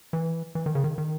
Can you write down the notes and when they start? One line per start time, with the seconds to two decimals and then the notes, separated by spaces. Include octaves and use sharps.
0.13 E3
0.55 E3
0.66 D#3
0.75 C#3
0.84 D#3
0.98 D#3